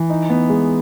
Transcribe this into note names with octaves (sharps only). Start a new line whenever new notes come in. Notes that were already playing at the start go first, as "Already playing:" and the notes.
Already playing: E3
D#4
B3
G#3